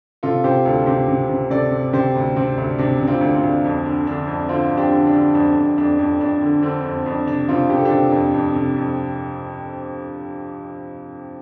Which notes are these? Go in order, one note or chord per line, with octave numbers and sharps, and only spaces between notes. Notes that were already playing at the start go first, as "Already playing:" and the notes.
C3 F4 A4
C3 G4 C5
D2 F4 A4
C3 G4 C5
C3
C3
C3 A4 D5
C3
C3 G4 C5
D2
C3 C4
D2
C3 D4
C3
C4 F4
D2
C4 F4
D2
F2 D4
D3
D3 D4
F2
D3 C4 F4
F2
D4 G4
D3
D4
D3
F2 D4
F2
F2 D4
F2
F2 D4
D3
D3 C4
F2
F2 D4
C3 D4
C3 C4 F4
C3 G4
A4
D4 G4
C3
F2
F2
C3
F2